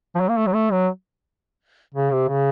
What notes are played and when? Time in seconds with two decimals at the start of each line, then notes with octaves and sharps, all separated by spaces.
0.15 F3
0.20 F#3
0.29 A#3
0.37 A3
0.47 F#3
0.54 A3
0.72 F#3
1.94 C#3
2.12 C3
2.29 C#3